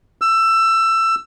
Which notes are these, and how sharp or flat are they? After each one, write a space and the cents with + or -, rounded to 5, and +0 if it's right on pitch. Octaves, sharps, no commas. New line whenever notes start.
E6 +20